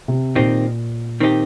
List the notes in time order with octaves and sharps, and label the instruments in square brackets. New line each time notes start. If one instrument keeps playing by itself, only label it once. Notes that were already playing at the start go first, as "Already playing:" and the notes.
[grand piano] C3
[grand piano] A#2 [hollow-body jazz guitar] D#3 C4 D#4 G4
[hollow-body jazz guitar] D#3 C4 D#4 G4